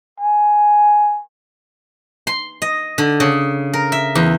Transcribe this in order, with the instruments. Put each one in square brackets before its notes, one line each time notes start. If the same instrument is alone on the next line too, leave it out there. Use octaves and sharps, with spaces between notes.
[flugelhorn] G#5
[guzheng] C6
D#5
D3
C#3
A#4
E5
E2